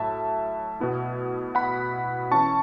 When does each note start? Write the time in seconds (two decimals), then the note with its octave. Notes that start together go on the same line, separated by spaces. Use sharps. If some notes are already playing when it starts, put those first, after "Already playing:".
Already playing: A2 F#3 A3 E5 A5
0.80 B2 B3 E4
1.55 F#5 B5
2.31 E3 C#4 E4 A5 C#6